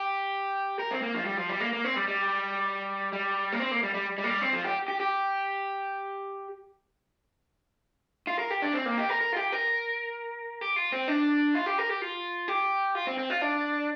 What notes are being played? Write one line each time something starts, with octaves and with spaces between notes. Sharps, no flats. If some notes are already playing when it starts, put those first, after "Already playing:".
Already playing: G4
A#4
C4
A#3
F3
G3
F3
G3
A#3
A#3
C4
G3
G3
G3
A#3
C4
A#3
G3
G3
G3
A#3
G3
C4
F3
G4
G4
G4
F4
A#4
G4
D4
C4
A#3
G4
A#4
A#4
F4
G4
A#4
G4
F4
C4
D4
F4
G4
A#4
G4
F4
G4
F4
C4
C4
F4
D4